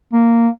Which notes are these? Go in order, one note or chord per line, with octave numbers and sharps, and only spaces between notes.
A#3